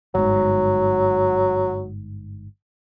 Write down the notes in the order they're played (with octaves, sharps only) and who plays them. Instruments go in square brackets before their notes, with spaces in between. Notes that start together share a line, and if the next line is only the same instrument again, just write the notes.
[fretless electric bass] G1 G#2 [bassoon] F#3